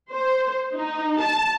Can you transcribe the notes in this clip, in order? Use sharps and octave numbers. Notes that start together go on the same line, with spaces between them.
C5
D#4
A5